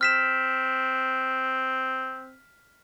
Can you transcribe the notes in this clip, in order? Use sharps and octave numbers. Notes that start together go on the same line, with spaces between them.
C4 F6 B6 E7